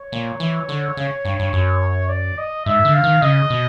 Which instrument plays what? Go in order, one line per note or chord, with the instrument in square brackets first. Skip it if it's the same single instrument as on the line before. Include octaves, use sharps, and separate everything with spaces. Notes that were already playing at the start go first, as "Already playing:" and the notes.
Already playing: [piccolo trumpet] C#5
[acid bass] A#2
E3
D3
C#3
G2
G2
F#2
[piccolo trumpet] D5
D#5
[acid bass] G#2 [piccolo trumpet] E5
[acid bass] D3
[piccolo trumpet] F5
[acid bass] D#3
[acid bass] C#3 [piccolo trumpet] D#5
[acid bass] B2